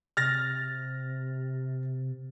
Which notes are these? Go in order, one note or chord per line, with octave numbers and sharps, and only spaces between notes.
C3 F6 A6 A#6